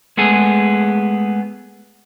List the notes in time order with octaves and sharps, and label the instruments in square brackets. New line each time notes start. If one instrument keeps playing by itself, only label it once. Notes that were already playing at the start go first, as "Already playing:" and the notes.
[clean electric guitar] G#3 A3 B3 G#4